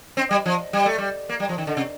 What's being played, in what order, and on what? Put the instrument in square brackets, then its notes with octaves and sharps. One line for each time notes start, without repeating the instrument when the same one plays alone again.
[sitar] C4
G3
F3
G3
A3
G3
A#3
G3
F3
D#3
D3
C3